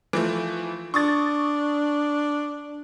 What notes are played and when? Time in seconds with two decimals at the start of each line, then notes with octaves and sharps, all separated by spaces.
0.13 E3 F3 A3
0.94 D4 C#6 D#6 A6